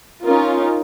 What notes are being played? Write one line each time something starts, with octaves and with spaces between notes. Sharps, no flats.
C#4 D#4 F4 A#4